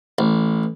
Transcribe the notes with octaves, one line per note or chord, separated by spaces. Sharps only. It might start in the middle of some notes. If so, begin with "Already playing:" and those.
A1